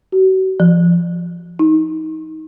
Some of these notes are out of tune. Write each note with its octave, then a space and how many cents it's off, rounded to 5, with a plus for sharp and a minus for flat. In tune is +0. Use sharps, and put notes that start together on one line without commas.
F#4 +40
F3 -15
D#4 +20